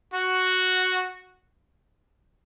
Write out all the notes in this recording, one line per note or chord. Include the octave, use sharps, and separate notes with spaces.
F#4